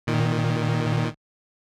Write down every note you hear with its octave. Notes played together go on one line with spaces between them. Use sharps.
A#2 D#3